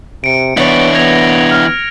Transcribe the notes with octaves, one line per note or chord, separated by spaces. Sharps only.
C3 C#7 D7
E3 B3 D4 E4 C#5
B3 G#6 A#6 F7
F6